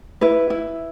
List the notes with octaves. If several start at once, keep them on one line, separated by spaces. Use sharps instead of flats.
E4 B4
E4